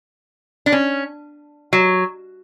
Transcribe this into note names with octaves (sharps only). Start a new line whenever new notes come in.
D4
C#4
F#3